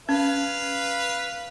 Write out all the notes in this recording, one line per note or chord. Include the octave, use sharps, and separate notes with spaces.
C#4 B4 F5